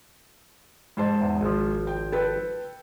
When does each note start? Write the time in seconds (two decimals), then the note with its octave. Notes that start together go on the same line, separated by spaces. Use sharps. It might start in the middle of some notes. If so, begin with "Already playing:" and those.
0.97 G#2 C5 A5
1.21 E2
1.41 G#1 F3
1.87 G5
2.12 A4 B4 G5